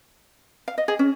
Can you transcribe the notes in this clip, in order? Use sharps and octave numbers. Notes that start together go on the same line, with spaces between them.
F5
D#5
G#4
C#4